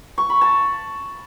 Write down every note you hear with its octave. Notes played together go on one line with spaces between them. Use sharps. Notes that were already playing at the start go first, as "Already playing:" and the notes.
C#6
B5
A5